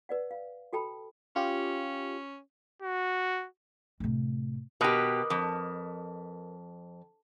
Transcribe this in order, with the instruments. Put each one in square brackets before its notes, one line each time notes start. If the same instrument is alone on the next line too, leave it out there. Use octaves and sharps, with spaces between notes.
[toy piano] B4 D5 F#5
F5
F#4 A4 G5 A5 B5
[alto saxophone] C#4 [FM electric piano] F4 G4
[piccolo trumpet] F#4
[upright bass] A2 C3
[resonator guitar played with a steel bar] B2 G4 [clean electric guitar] A#4 B4 D#5
[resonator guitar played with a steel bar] F2